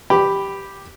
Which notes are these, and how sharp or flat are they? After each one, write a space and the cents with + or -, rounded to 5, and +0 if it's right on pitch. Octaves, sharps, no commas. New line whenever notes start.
G4 +0 B5 +0